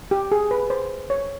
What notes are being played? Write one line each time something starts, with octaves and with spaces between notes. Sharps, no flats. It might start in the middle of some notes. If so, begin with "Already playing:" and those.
G4
G#4
B4
C5
C#5